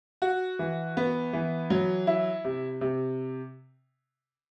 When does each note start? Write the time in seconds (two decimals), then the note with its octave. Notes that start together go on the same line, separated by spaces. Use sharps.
0.22 F#4
0.59 E3
0.97 B3
1.33 E3
1.70 F#3
2.07 E4
2.44 C3
2.81 C3